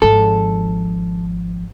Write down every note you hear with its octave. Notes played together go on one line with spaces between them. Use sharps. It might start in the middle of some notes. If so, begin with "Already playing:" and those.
G#1 F3 A4